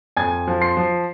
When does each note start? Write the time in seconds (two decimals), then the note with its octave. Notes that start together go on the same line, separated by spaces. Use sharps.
0.17 F2 G#5 G#6
0.47 F3
0.61 C6 C7
0.77 F3